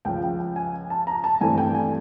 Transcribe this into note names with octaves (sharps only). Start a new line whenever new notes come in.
C#2 C#3 F3 G5
G5
G5
G#5
A5
A#5
A5
G2 E3 A3 C4 G#5
G5
G#5